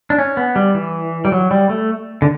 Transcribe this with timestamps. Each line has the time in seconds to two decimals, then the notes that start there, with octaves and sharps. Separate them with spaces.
0.10 D4
0.18 C#4
0.37 B3
0.56 G3
0.74 E3
1.25 G3
1.32 F#3
1.51 G3
1.69 A3
2.22 D3